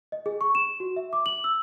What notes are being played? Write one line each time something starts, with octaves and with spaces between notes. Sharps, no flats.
D#5
G#4
C#6
E7
F#4
E5
D6
F#7
E6